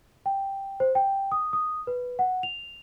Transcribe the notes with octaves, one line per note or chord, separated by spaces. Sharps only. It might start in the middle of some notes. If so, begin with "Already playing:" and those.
G5
C5
G5
D#6
D#6
B4
F#5
F7